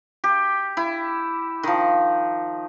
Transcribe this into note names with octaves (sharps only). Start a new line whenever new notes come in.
G4
E4
D#3 F3